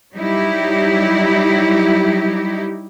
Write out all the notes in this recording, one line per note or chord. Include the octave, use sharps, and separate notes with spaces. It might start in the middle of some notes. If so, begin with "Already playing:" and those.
F#3 G3 D#4 E4 G4